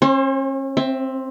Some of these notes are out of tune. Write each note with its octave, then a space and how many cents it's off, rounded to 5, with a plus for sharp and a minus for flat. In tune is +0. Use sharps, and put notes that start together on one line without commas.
C#4 -40 C5 +25
C4 +10 E5 +0